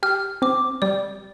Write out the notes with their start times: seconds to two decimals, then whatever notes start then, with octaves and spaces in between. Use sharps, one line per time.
0.03 G4 F6
0.42 C4 D6
0.82 G3 D5